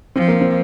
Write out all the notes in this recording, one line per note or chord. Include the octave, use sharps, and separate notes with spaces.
F3 C4
A#3
C4